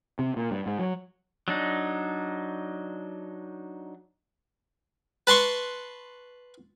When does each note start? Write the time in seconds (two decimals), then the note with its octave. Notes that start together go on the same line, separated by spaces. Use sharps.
0.19 C3
0.36 A#2
0.51 G2
0.66 G#2
0.79 F#3
1.48 F#3 D4 D#4
5.27 B4 A5 C6 C#6